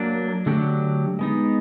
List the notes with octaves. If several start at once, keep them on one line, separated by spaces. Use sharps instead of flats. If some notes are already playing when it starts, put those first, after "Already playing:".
Already playing: F#3 A#3 D4
D3 F#3 A3 D4 G4
G#3 B3 D#4